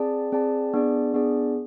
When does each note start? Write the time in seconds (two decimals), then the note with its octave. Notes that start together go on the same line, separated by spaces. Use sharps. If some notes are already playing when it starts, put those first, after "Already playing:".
Already playing: C4 G#4 D5 A5
0.32 C4 G#4 D5 A5
0.74 B3 D4 G#4 D5
1.14 B3 D4 G#4 D5